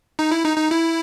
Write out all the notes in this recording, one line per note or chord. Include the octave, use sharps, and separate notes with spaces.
D#4
E4
D#4
D#4
E4